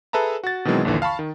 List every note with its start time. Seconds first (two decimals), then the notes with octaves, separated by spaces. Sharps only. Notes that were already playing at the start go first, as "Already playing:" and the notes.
0.13 G#4 A4 B4 E5 A5 A#5
0.44 F#4 A6
0.65 B2 D#3 E3 F#3 G#3 C4
0.85 A#1 D#2 D3 E3
1.02 F5 A5 B5 C#6
1.19 D#3